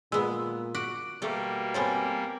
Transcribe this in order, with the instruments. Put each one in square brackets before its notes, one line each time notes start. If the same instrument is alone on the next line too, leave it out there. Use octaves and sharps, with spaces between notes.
[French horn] A#2 [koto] G#3 B3 [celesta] E6
[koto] F#4 F#5 [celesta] D6 D7
[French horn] B2 [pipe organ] G3 A#3 [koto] A3 A4
[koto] B3 C4 A4 [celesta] C#5 G#5